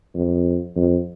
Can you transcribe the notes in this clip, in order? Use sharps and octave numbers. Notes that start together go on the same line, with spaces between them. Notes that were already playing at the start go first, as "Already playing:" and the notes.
F2
F2